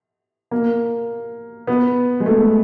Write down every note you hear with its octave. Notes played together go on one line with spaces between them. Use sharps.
A#3
B3
G#3
A3